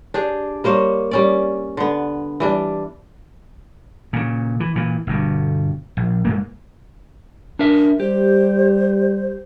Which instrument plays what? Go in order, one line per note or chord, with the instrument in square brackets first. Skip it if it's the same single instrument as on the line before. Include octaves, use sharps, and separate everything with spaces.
[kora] D4 G4 G#4
G3 A#3 C5 C#5
G3 C#4 D5
D3 B3
E3 G3 D4
[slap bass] A#2 C#3
E3
A#2 E3
G1 G2 B2
A#1
G2 G#3 A#3
[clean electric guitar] D4 A#4 E5
[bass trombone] G3 [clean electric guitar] G4 [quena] C5